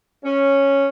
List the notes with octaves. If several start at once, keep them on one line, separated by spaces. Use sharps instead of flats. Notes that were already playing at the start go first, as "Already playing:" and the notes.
C#4